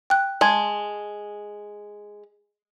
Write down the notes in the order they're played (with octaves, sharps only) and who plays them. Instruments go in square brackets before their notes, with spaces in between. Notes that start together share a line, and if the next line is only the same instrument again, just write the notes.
[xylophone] G5 F#6
[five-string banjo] G#3 [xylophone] A5 C6 G#6